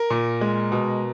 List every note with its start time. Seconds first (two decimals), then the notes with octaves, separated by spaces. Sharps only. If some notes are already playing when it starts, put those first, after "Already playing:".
Already playing: A#4
0.10 A#2
0.41 G#3
0.72 B2